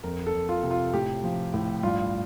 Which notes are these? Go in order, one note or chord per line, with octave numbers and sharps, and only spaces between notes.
F2 A#4
A4
F2
F4
C3
F4
A2 G4
F3
A2
G2 F4